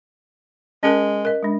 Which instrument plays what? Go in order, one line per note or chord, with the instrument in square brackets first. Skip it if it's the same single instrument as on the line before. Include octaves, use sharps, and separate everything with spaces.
[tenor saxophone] G#3 [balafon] C#4 A#4
[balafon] A#4 D#5
G#3 D4